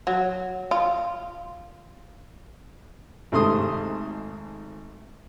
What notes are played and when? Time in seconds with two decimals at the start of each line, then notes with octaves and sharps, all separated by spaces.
0.07 F#3
0.71 F4
3.32 G#1 C3 A3 C6 D#6